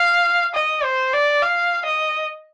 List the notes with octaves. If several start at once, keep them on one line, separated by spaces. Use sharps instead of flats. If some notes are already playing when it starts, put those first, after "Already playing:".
Already playing: F5
D#5
C5
D5
F5
D#5